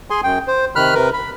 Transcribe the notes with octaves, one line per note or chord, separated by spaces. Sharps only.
G#4 G#5 C6
F#2 G5
C5
C3 D#3 B5 F6 F#6
C3 A#4 B4
B5